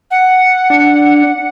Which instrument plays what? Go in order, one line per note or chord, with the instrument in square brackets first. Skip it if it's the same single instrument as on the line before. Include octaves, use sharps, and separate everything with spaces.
[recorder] F#5
[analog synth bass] D4